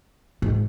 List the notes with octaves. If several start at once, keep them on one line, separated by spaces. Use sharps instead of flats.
G#2